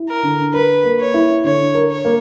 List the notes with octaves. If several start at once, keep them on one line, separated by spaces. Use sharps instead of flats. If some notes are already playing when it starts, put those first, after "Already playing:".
Already playing: E4
A#4
D3
A#4 B4
A#3
C#5
E4
D3 C#5
A#4
C#5
A#3